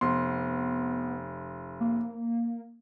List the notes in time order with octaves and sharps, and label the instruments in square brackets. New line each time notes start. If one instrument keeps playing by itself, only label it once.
[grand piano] F1 C6 [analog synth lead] B3
[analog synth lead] A#3